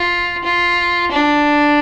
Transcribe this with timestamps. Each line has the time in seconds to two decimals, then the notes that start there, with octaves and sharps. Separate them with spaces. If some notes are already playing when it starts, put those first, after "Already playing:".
Already playing: F4
0.44 F4
1.11 D4